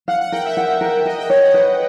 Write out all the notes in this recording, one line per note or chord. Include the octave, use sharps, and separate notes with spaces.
F5 F#5
F#5
A#4 G5
E5
F#5
A#4
A#4 D#5
G5
C#5 G5
F#5
B4